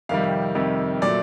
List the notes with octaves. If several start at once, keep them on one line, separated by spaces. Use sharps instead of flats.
F2 C3 D#3 G3 F5
F2 C3 D#3 G3
A#2 F#3 A3 D5